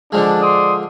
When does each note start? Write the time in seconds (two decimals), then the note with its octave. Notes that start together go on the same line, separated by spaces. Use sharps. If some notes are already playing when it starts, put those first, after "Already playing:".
0.12 D3 F3 G#3 D4
0.42 D5 C6 D#6